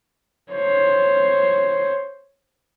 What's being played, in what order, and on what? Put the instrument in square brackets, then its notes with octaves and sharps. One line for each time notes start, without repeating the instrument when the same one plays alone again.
[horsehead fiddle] C5 C#5